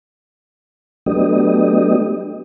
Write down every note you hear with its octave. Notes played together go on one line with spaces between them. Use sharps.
F#3 A3 B3 D4 G4 D#5